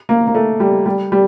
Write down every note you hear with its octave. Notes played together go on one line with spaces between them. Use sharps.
A#3
A#3
A3
G3
G3
G3